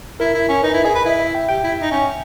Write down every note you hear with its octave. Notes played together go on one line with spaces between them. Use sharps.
E4 A#4
E4
C#4
D#4 B4
E4
G#4 D#5
B4
E4 E5
E5
G5
G4 G5
E4
D#4
C#4